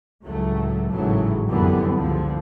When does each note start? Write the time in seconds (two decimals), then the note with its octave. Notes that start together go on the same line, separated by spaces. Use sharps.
0.23 C#2 A2 F#3 A3
0.90 G#1 A2 C#3 E3 F#3 A3
1.48 F1 F#2 D3 E3 G3 B3
1.96 C#2 G2 D3 F3